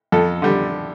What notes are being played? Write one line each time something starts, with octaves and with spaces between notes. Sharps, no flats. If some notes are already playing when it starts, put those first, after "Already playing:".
F2 A4
D3 G3